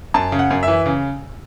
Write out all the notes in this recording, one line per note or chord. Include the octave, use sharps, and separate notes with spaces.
F#2 A5
C#3
F#5
F#2
E3 E5
C#3